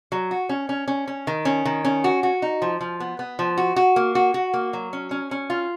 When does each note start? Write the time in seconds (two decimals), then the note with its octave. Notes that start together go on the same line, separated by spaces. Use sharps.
0.12 F#3
0.31 F#4
0.49 C#4
0.69 C#4
0.88 C#4
1.07 C#4
1.27 D#3
1.45 C#4
1.65 D#3
1.85 C#4
2.04 F#4
2.23 F#4
2.42 D#4
2.62 F3
2.81 F3
3.00 B3
3.19 B3
3.39 F3
3.57 F#4
3.76 F#4
3.96 A#3
4.15 F#4
4.34 F#4
4.54 A#3
4.73 F#3
4.93 C#4
5.11 C#4
5.31 C#4
5.50 F4